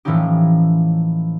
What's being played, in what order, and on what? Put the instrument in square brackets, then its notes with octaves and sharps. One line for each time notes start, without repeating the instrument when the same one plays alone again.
[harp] A2 E3 F3 C#4 D#4 G4